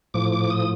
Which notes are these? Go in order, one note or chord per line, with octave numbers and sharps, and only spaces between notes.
A2 F3 D6
D6
D#6